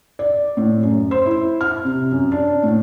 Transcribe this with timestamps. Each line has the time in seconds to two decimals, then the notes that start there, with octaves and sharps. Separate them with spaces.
0.19 D5
0.57 A2
0.83 F#2
1.11 C5
1.25 E4
1.61 F6
1.85 C3
2.12 F#2
2.32 D4
2.63 A2